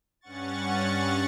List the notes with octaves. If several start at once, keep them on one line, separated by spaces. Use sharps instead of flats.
G2 C#4 F#5 C#6 A6